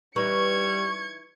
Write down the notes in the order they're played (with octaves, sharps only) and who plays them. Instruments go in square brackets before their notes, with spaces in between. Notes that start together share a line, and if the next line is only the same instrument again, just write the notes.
[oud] E3 D#4 B4 [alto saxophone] G3 [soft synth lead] C#6 [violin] G#6 C#7